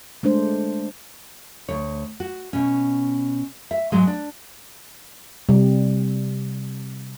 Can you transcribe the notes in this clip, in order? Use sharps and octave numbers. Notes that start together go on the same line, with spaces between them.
G#3 A3 D4 C5
D2 C#5
F#4
B2 C#4
E5
G#2 F#3 G#3
D4
C3 G3